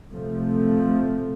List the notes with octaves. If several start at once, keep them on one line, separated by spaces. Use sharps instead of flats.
C3 F3 A3